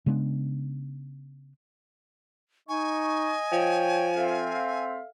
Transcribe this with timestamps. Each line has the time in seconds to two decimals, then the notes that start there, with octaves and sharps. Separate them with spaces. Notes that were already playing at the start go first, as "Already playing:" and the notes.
0.06 C#3 G#3 B3 D4
2.69 D#4 D#5 G#5 C#6
3.52 F3 C#5 G5
4.16 C4 A4 E5 F5